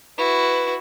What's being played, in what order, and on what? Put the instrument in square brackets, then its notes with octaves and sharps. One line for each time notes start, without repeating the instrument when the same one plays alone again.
[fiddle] E4 F#4 [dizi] B4